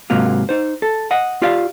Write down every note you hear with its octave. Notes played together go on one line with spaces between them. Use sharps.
G#2 C3 F#3 A#3 F4
D#4 C5
A4
D#5 F#5
F4 G4 D5 F5